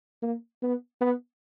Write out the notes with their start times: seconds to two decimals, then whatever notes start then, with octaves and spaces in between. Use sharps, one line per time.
0.22 A#3
0.62 B3
1.01 B3